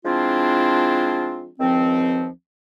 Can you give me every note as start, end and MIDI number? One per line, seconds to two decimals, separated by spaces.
0.05 1.51 53
0.05 1.51 56
0.05 1.51 60
0.05 1.51 62
0.05 1.51 64
0.05 1.51 65
1.60 2.28 37
1.60 2.28 51
1.60 2.28 53
1.60 2.28 60